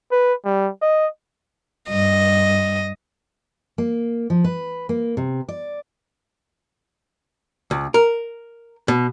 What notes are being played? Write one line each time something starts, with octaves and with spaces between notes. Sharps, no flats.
B4
G3
D#5
G2 D#5
A#3
F3
B4
A#3
C3
D5
C#2
A#4
B2